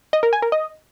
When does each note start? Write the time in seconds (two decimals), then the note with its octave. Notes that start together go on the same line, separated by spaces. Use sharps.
0.13 D#5
0.23 A#4
0.33 G#5
0.42 A#4
0.52 D#5